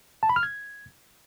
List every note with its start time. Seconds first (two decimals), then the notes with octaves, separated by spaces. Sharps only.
0.23 A5
0.29 B5
0.36 F6
0.43 G#6